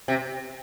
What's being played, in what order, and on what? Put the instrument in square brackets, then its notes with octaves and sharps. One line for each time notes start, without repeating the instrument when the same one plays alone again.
[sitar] C3